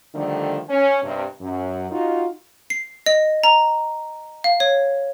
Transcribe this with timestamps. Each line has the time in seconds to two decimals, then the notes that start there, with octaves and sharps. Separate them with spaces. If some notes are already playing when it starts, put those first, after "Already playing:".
0.15 D3 D#3 F3 G3 A3 D4
0.69 C#4
1.03 G2 C3
1.41 F#2
1.91 D#4 F4 F#4
2.70 C7
3.06 D#5
3.44 A#5
4.44 F5
4.60 C#5